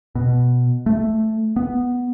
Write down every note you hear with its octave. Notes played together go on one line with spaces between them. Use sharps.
B2
A3
B3